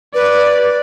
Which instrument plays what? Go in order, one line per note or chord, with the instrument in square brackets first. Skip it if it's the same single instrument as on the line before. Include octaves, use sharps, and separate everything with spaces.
[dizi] B4 [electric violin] D5